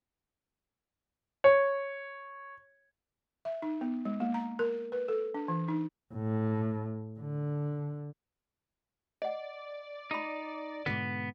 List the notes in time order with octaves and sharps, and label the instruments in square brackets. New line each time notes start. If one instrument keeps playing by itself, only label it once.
[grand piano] C#5
[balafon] E5
D#4
B3
G#3
A#3
A#5
A#4
B4
A4
D4
E3
D#4
[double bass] A2
D3
[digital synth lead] D5 [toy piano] D#5 F#5
[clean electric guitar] D#4 [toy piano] F4 B5
[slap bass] G#2 B2 D3 [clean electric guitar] B3